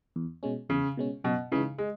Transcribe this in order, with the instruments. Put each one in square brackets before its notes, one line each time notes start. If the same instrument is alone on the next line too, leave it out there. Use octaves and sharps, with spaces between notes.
[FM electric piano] E2
B2 G#3 C#4
[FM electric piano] E2 [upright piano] C#3
[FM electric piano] B2 G#3 C#4
[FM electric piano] F#2 [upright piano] B2
[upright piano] C#3 [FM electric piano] E3 G#3 D#4
[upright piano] G#3